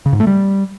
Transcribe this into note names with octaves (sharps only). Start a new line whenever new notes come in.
C#3
G#2
A3
G3